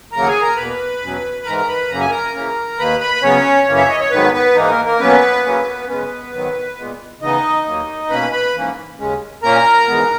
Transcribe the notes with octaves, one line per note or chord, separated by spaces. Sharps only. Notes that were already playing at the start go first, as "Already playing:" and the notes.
D#2 C#3 F#3 A#3 A#4 A#5
F#5
G#4 G#5
A#4 A#5
E2 B2 A#3 B4 B5
E2 B2 F#3 C#4
G#2 E3 G#3 A#4 A#5
A#5
B4 B5
F#2 C#3 F#3 A#3 C#4 A#5
G#5
A#4 A#5
C#3 E3 A#3 C#4
D#2 D#3 A#3 B4 B5
B4 B5
B4
C#3 F#3 B3 C#4 C#5
F#2 C#3 E3 A#3 C#4
E5
D#5
C#5
G#2 D#3 F#3 B3 B4
B3 B4
G#2 E3 A#3 D#4
A#3 A#4
A#3 A#4
B2 F#3 A#3 B3 C#4 B4
C#3 F#3 A#3 C#4
F#2 C#3 G#3 B3 C#4 B4
G#2 D#3 F#3 B3
A#2 G#3 B3
C#3 E3 B3 D#4 D#5
D#2 D#3 F#3 A#3
B2 A#3 C#4 B4 B5
B4 B5
G#2 E3 A#3 C#4
D#2 C#3 G#3 C#4
A#2 A#3 C#4 A#4 A#5
G#2 E3 G#3 B3